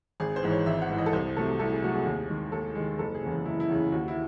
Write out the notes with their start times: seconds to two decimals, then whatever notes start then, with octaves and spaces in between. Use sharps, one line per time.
0.20 G#1 G#4
0.36 C5
0.43 G#2 E3
0.51 C#5
0.66 G#1 E5
0.82 F#5
0.89 G#2 E3
0.98 D#5
1.06 A4
1.13 C2 C5
1.36 C3 F#3 A3 A4
1.59 C2 A4
1.72 G#4
1.82 C3 F#3 A3 F#4
1.94 G#4
2.05 D#2
2.29 D#3 G#3
2.52 D#2 A4
2.75 D#3 G#3
2.99 F#1 A4
3.14 G#4
3.23 E2 C#3
3.45 F#1 E4
3.60 E4
3.69 E2 C#3
3.92 D#2 F#4
4.08 E4